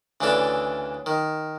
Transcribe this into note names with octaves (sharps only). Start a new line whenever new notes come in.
D2 C#3 E3 D4 A4
D#3